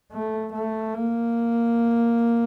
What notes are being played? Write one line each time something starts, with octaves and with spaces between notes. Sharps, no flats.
A3
A3
A#3